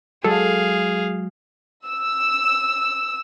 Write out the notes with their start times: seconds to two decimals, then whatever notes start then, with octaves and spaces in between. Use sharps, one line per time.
0.24 F#3 G#3 G#4 A4 F5
1.87 E6